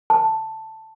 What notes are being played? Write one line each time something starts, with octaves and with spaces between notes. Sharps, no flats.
A5